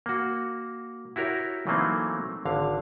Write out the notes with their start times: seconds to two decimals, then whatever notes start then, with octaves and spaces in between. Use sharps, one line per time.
0.06 A#3 F#4
1.16 E4 F#4 G4 A#4 C#5
1.67 E3 F#3 A3 A#3 C4 D#4
2.45 G#1 D3 F5